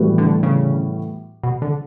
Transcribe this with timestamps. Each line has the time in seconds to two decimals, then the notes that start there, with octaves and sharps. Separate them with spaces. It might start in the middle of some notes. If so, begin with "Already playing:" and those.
Already playing: A2 E3 G3 B3 F#4
0.18 D3
0.43 C#3
1.44 B2
1.62 D3